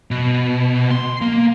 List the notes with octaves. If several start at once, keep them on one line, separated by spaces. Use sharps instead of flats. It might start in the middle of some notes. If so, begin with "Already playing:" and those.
B2
C6
A#3